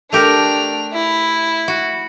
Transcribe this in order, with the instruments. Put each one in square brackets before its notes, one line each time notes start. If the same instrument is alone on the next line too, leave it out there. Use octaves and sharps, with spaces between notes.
[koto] A3 G4 A#4 [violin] D4 F7
[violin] E4
[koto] F#4